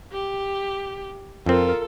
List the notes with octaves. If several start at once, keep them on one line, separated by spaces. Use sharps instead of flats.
G4
F2 C4 F4 A4 A#4